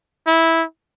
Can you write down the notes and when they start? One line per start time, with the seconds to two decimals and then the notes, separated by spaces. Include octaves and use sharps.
0.27 E4